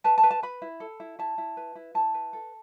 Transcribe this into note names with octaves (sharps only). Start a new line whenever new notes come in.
B4 A5
A5
B4
A5
B4 B5
E4
A4
E4
E4 A5
E4
B4
E4
E4 A5
B4
A4